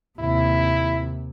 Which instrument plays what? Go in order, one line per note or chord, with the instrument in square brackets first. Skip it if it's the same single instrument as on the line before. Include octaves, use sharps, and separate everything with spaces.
[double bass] D#2 C3 [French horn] E4